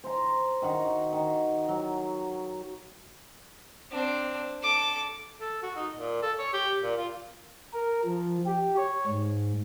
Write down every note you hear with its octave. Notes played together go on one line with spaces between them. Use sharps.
C5 A#5
D#3 F#4 F#5 A#5
D#3
F#3
C4 D4
A4 D6
A4
F#4
D#4
A#2
A4
C#5
G4
A#2
F4
A#4
F3
G4
C#5
G#2